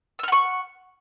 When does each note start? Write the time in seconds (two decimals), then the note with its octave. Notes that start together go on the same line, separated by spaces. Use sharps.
0.19 E6
0.23 F6
0.28 F#5
0.32 C#6